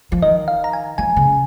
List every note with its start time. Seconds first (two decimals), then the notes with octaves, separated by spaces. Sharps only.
0.12 F3
0.22 D#3 D#5
0.48 F5
0.64 A#5
0.73 G#5
0.98 F3 G#5
1.16 C#3